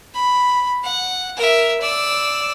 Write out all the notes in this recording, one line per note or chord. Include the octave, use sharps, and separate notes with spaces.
B5
F#5
A#4 E5
D5 E6